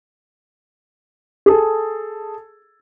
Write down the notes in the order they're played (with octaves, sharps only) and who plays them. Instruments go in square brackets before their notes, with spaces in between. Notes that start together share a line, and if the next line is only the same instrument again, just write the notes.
[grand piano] G#4 A4